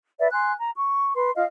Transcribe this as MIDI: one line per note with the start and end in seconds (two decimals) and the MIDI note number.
0.19 0.28 71
0.19 0.28 74
0.19 0.28 76
0.32 0.53 80
0.32 0.53 84
0.32 0.53 90
0.59 0.69 82
0.76 1.14 85
1.16 1.30 71
1.16 1.30 84
1.35 1.44 65
1.35 1.44 75
1.35 1.44 77